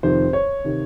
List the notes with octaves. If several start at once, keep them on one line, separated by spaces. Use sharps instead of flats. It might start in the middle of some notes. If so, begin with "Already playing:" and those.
F2 C3 D#3 C5
C#5
C3 D#3